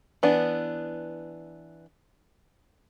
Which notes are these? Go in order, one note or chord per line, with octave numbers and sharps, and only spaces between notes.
E3 B3 D4